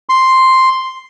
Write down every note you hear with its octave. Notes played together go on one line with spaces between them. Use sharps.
C6